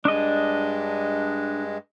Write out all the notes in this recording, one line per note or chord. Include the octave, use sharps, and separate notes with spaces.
G2 G#3 D4 D#5